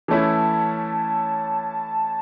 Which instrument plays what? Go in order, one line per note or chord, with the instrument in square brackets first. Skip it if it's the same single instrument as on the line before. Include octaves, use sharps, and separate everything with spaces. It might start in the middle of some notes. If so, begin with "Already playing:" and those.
[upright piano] E3 A3 C#4 E4 [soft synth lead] A5